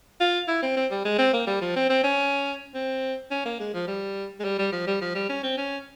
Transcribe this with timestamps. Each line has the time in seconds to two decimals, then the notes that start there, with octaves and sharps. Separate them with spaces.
0.20 F4
0.48 E4
0.62 C4
0.76 C4
0.91 G3
1.05 G#3
1.19 C4
1.33 A#3
1.47 G3
1.61 F3
1.76 C4
1.90 C4
2.04 C#4
2.74 C4
3.31 C#4
3.45 A#3
3.60 G#3
3.74 F3
3.87 G3
4.40 G#3
4.44 G3
4.59 G3
4.72 F3
4.87 G3
5.01 F3
5.15 G3
5.29 C#4
5.43 C4
5.57 C#4